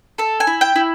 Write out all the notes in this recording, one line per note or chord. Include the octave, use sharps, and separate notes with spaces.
A4 A5
G#5
E4
G5
E4